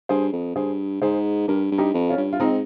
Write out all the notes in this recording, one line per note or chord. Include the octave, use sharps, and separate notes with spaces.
G2 G#4 C5
F2
G2 G#4 C5
G#2 G#4 C5
G2 G4 A#4
G2
D#4 G4
F2
C#4 F4
G2
F4
G#2 C4 D#4